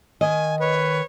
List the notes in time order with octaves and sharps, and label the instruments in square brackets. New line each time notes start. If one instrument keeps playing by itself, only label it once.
[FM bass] D#3 [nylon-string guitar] D#5 [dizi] G#5
[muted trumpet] B4 [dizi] C#5